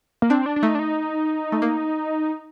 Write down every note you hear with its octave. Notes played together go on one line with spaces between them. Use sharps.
A#3
C4 D4
D4
D4
A3 D#4
D4
D#4
A3
A#3